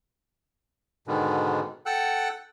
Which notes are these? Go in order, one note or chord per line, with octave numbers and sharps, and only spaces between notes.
G#2 B2 D3 D#3
A4 F#5 G5 E6 F#6